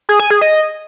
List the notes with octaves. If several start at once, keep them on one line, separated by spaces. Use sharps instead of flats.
G#4
G#5
G#4
D#5